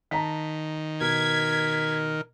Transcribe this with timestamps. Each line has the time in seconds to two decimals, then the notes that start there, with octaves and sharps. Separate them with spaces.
0.11 D#3 A5 A#5 B6
1.01 B2 A#4 G#6 B6